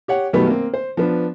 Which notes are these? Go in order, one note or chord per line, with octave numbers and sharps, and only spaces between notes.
G4 C#5 F#5
F#2 B2 D#3 G3 A3 B3
A#3 C4
C5
F3 B3 D4